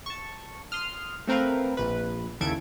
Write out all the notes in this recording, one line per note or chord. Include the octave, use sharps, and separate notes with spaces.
A5 C#6
C6 D#6 F6
A3 C4 A#4 B4 F5
A#1 B4
D#2 C#3 E4 A4 G#6 D7